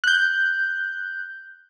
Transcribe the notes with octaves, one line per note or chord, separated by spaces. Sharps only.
F#6 G6